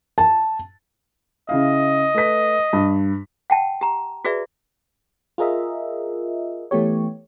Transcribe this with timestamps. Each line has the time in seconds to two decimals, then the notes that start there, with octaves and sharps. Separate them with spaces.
0.18 A5
1.49 C#3 E4 D#5 F5
2.14 A3 B4 B6
2.73 G2
3.50 F#5 G5 A5
3.81 G4 A#5
4.25 F#4 G#4 B4 D5 E5
5.38 F4 G#4 A#4 D#5 E5
6.71 E3 A3 B3 G4 C#5